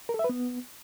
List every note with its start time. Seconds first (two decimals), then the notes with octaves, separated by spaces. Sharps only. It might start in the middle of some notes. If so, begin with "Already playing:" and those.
0.09 A#4
0.14 A4
0.19 E5
0.24 B4
0.29 B3